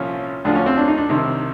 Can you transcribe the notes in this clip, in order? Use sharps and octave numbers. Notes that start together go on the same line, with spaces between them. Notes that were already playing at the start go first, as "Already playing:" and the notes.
Already playing: C2 A#2 F3 C#4
D2 D3 F3 D4
C#4
C4
D4
D#4
D4
C2 C3 D#3